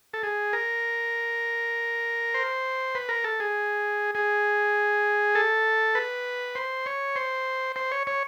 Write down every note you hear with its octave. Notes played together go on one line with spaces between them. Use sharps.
A4
G#4
A#4
C5
B4
A#4
A4
G#4
G#4
A4
B4
C5
C#5
C5
C5
C#5
C#5